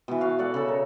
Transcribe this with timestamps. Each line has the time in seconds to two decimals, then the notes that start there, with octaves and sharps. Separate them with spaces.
0.08 B2 E3
0.21 F#4 F5
0.39 A4 D5 F#5
0.54 C#3 A4
0.68 A#4